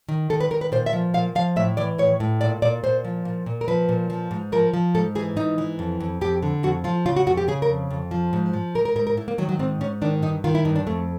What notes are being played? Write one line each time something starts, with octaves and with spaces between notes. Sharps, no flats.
D#3
D#3 A4
B4
D#3 A#4
B4
A#2 C5
E5
F3
A#2 F5
F3 F5
A2 E5
E3 D5
A2 C#5
A2
A#2 D5
A#2 D5
A#2 C5
F3
A#2
A#2
A#4
F3 B4
A#2
F3
G#2
F3 A#4
F3
G#2 A4
E3 G#4
G#2 D#4
E3
F2
F2
F2 G4
D3
F2 F#4
F3 F4
C#3 F4
F#4
F2 F#4
G4
C#3 G#4
A#4
F2
F2
F3
G#2
F3
G#2 A#4
A#4
G#2 A#4
A#4
G#2 E4
A#3
D#3 F#3
F#3
G#2 C4
G#2 C#4
D#3 D4
G2 D#4
D#3 F4
E4
G2 D#4
D4
F2 A3